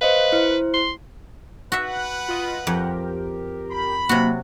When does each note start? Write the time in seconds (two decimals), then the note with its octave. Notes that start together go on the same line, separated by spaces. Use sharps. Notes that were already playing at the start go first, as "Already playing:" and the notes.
0.01 B4 C5 D#5 F5
0.33 E4 C5
0.74 C6
1.72 F#4 B4 E5 F#5
2.29 F4 D#5
2.67 F2 G4 A#4
3.71 B5
4.09 C3 F#3 A#3 F#4